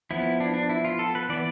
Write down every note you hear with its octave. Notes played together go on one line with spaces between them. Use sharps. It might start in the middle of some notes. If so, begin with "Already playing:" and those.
F3 B3 E4
D4
D4
E4
F4
A4
B4
E3 B3 D5